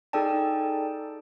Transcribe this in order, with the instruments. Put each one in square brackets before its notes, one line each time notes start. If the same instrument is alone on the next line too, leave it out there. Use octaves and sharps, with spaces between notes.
[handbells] D#4 G#4 A4 D5 G5 A5